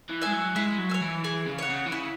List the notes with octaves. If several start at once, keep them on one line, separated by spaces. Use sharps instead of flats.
E3
G#3 E5 G#5
F#3
G#3 E4
F#3
C#5 E5 G#5
E3
E3 G#4
C#3
C#5 F#5
C#3
E3
C#3 E4